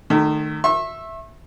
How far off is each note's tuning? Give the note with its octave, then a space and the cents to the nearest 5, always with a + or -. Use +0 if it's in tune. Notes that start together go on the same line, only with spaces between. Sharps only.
D#3 -30 A3 -5
E5 +0 C#6 -40